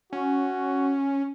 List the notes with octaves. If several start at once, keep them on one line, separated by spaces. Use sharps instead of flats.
C#4 F#4